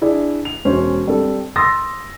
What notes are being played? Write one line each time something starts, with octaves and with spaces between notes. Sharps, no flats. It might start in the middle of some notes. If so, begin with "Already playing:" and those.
D4 E4 G#4 D5
F7
E1 C#4 C5
G3 C4 A4
C6 D#6 E6 A6 A#6